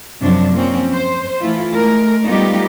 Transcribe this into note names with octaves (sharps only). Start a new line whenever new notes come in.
F#2 C3 F3 F#3 D4
F3 A#3 C4 C#4
C5
E3 A3 E4 F4
G#3 A3 A#4
G3 A3 B3 D#4 F4 G4